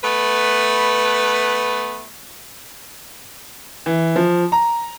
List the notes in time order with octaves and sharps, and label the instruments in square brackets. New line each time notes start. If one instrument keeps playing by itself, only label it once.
[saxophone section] A3 B3 B4
[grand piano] E3
F3
A#5